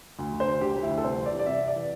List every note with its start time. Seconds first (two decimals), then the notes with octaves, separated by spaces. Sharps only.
0.19 D2
0.33 D3
0.40 C5
0.47 D2
0.61 D3 G4
0.76 D2
0.83 E4
0.90 D2
0.97 A4
1.04 C2 C5
1.18 E3
1.26 D5
1.33 C2
1.39 D5
1.46 C2 E5
1.60 C3
1.68 D5
1.75 E3